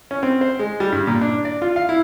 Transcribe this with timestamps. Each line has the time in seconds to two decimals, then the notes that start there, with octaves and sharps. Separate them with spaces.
0.11 C#4
0.23 C4
0.41 C5
0.59 G#3
0.80 G3
0.92 G2
1.07 A#2
1.21 D4
1.45 D5
1.62 F4
1.76 F5
1.89 E4